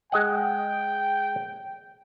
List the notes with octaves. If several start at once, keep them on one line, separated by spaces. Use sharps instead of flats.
G#3 D#5 F#5 G5